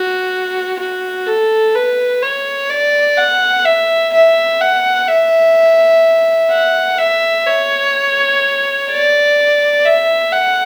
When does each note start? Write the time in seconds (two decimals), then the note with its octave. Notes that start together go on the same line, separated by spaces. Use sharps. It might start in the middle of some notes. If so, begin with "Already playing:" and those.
Already playing: F#4
0.79 F#4
1.27 A4
1.75 B4
2.22 C#5
2.69 D5
3.17 F#5
3.65 E5
4.13 E5
4.61 F#5
5.08 E5
6.51 F#5
6.99 E5
7.47 C#5
8.90 D5
9.86 E5
10.33 F#5